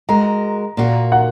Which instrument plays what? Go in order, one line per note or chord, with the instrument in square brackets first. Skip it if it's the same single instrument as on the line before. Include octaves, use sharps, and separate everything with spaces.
[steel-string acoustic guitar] G#3 F#4 A#4 [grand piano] A#5
[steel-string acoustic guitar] A#2 A#3 F#4
[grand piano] F#5